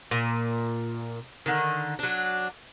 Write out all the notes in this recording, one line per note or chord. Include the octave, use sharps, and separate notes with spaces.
A#2
D3 D#3
F#3 D4